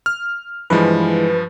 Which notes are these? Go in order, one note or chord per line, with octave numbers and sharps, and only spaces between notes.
F6
G2 E3 F3 G#3 B4